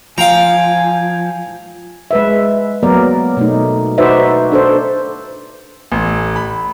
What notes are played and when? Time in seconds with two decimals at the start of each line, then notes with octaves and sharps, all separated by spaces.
0.18 F3 F5 G5 G#5 A#5
2.11 G#3 B4 E5
2.83 F#3 A#3 B3 A#4 D5
3.37 B2 A3 D#4
3.98 D#4 F#4 B4 C5 D5 E5
4.52 D4 A4 C5
5.92 A1
6.36 B5